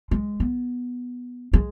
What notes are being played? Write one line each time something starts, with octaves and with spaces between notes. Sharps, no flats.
G#3
B3
G#3